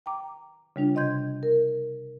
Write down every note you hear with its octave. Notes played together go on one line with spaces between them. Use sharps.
G5 A#5 D6
C#3 G3 D4 F4
C3 D#5 C6 G6 G#6
A#4